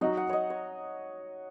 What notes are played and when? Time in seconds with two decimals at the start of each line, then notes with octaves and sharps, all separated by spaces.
0.01 F#3 D#4 F#4 D#5
0.17 F#5
0.29 C#5 D#5
0.50 C#5